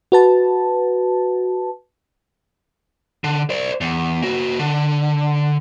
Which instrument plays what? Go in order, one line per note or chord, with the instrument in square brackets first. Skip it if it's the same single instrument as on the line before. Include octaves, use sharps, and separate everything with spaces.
[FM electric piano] F#4 B4 A5
[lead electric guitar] D3
C5 D5
E2
A#3 F#4
D3